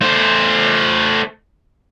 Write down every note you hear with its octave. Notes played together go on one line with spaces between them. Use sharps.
A3 C5